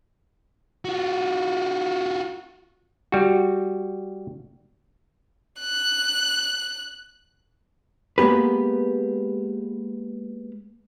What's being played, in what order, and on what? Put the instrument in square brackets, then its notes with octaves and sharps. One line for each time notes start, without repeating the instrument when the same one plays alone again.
[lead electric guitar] F4 F#4
[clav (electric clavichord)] G3 F#4
[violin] F#6
[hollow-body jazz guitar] G#3 A#3 B3 G4 B4